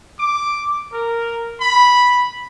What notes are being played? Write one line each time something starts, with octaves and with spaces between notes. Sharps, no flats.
D6
A#4
B5